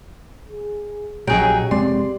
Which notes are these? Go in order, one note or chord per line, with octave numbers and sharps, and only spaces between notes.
G#4
A#1 F#3 C#4 D#4 G4 G#4 G5
F1 G#3 C4 D5 C6